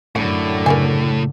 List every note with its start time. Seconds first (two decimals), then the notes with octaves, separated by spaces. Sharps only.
0.16 F#2 A2 D3 F#5
0.66 C#3 A#4 B4 G#5